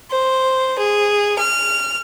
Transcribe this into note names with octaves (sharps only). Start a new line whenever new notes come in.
C5
G#4
F6